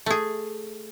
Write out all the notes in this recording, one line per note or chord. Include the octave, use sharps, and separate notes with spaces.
A3 G#4